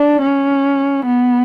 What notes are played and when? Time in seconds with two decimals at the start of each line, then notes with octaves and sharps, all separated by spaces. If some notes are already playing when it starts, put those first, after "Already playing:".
Already playing: D4
0.22 C#4
1.06 B3